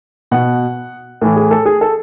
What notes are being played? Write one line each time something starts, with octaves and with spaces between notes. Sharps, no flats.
B2 F#5
A2 E3 A4
G#4
A4
G#4
A4